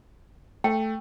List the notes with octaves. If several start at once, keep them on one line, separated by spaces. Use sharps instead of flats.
A3 G5